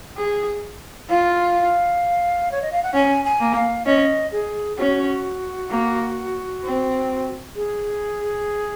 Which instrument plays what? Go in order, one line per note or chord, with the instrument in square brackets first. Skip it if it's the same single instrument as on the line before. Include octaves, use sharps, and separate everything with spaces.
[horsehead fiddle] G#4
[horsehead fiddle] F4 [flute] F5
[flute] C#5
D#5
F5
F#5
[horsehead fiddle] C#4 [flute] G#5
[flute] G#5
[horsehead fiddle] A#3
[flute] F5
[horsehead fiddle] C#4 [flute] D#5
[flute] G#4
[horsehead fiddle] C#4 [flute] F#4
[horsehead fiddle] A#3
C4
[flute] G#4